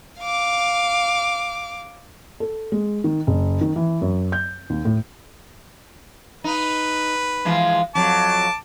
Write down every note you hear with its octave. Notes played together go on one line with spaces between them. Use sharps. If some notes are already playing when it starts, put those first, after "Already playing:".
F5 D6
A4
G#3
D#3
F#1
D#3
E3
F#2
G6
D#2
A2
D#4 B4
E3 F3 G#3
F2 F#3 A5 D6